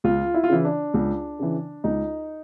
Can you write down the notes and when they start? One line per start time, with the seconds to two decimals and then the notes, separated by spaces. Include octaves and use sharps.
0.04 C#2 F4
0.34 E4
0.44 F4
0.49 C#3 E3 E4
0.65 D4
0.94 C#2
1.39 C#3 E3
1.84 C#2 D#4